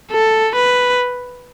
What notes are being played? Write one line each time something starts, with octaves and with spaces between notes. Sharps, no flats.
A4
B4